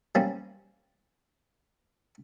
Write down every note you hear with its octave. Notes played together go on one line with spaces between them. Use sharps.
G3 A#3 C4 C#4